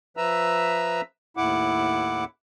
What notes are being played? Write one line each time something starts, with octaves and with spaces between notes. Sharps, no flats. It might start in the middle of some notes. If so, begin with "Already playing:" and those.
F3 B4 E5 A#5 E6
D#2 A2 E4 F#5 D6